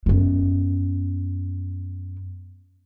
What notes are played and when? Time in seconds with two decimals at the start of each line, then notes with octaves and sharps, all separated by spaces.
0.06 F#2 B3